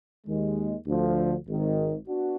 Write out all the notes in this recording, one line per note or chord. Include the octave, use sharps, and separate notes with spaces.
D#2 D#3 G#3
D2 D3 F3
G#1 G#2 D#3
B3 D4 F#4